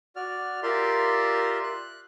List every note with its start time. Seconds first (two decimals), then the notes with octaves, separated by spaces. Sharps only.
0.16 F#4 D5 F6
0.63 F4 G4 A#4 D5 E5 C6
1.64 F#6